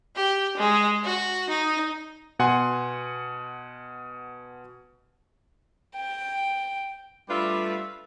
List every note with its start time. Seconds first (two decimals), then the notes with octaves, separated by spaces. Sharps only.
0.16 G4
0.57 G#3
1.04 F#4
1.49 D#4
2.39 B2 F#5 G#5 C6
5.96 G5
7.29 G3 A3 D4 F4 B4 E5